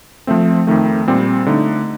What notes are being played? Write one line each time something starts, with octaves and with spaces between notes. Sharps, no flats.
F3 A3 C4
F2 D#3 A3
A#2 G3 C4
D3 A3 D#4